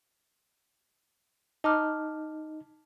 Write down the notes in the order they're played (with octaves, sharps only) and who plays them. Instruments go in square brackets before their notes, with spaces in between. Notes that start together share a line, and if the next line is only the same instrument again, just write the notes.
[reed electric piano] D#4 [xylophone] A5 D6 F6